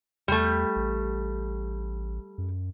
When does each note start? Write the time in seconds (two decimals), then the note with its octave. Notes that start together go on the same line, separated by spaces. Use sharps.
0.28 E2 G3 A3
0.76 A1
2.38 F#2